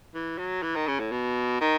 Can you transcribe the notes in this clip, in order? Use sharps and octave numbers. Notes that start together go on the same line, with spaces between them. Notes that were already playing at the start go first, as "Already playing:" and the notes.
E3
F#3
E3
D#3
C#3
A2
B2
D#3